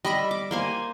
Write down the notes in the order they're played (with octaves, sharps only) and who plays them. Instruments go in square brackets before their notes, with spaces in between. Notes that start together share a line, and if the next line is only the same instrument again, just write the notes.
[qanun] G3 E5 [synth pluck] D#5 B5 A#6
[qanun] D6
A#3 C5 G#5